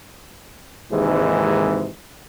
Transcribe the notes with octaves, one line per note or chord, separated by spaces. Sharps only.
G#1 D#2 G#2 C3 E3 G#3